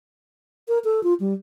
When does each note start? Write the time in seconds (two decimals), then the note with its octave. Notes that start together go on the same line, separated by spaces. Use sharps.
0.68 A#4
0.85 A4
1.04 F4
1.20 G3